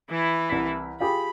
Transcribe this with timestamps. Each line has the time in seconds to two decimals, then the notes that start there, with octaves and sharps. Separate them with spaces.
0.10 E3 E4
0.49 C2 B6
1.00 F4 G4 G#4 B5